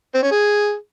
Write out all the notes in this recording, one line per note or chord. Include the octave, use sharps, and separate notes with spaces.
C4
C#4
G#4